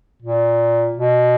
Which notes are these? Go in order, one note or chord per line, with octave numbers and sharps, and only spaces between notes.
A#2
B2